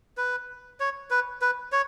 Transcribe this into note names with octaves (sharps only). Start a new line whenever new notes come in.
B4
C#5
B4
B4
C#5